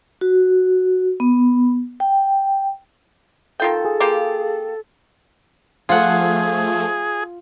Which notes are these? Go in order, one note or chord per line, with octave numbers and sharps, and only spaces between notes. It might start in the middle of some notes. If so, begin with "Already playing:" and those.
F#4
B3
G5
D#3 F4 A4 G5
G#4
A#3 F4 G4
F3 A3 F4 G#4 F#5